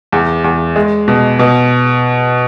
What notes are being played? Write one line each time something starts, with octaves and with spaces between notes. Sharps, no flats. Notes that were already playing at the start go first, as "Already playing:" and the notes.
E2
E2
G#3
B2
B2